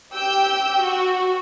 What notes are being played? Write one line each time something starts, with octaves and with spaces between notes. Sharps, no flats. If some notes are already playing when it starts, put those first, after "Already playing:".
G4 G5 E6 G6
F#4